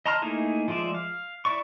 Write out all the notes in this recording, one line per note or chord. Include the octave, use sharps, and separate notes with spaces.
D#5 A5 A#5 C6 F6
A3 A#3 D#4 E4 G#4
F3 G#3 F4 D5 E5
F5
E4 D5 C#6